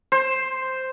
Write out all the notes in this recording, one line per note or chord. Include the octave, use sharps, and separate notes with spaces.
C5